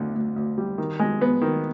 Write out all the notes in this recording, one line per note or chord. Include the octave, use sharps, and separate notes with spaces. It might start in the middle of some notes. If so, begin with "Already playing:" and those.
Already playing: D2 D3
D2
D2
G3
D#3
G#3
B3
D#3